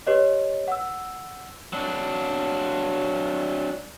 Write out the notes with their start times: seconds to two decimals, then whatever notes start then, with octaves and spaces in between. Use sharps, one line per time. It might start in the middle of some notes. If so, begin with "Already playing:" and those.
0.07 G4 B4 C#5 D#5
0.68 F#5 E6
1.73 F#3 D4